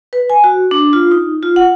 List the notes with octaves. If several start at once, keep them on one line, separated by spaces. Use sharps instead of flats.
B4
G#5
F#4
D4
F4
D#4
F4
F#5